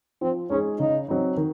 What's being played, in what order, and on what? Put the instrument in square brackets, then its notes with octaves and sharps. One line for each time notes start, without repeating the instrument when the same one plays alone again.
[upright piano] F3 [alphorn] C4
[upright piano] G#3 D#4 G#4 [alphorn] C#4
[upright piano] C#3 [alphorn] D#4
[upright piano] F#3 C4 D#4
D#3